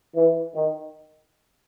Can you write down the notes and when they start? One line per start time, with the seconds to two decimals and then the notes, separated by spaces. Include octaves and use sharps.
0.13 E3
0.53 D#3